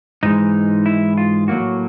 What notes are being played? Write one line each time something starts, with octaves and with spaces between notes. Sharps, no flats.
G#2 E3 G#3 D#4
E4
F4
A2 F#3 A#3 F#4